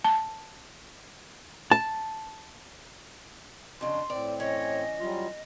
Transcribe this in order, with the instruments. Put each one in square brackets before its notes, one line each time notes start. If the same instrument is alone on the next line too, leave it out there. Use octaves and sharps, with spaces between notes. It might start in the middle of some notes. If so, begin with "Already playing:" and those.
[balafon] A5
[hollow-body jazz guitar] A5
[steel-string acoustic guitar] F2 C#3 [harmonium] D4 [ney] C6
[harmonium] A2 C4 [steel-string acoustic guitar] D5
[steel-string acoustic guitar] E3 C#4 [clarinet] C#5 [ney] D#5
[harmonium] F#3 G3 [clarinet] F4